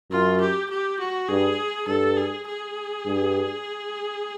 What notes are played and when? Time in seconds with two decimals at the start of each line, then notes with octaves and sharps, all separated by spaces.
0.10 F#2 F4
0.41 G4
0.70 G4
0.99 F#4
1.29 G2 G#4
1.87 G2 A4
2.17 G#4
2.47 G#4
3.06 G2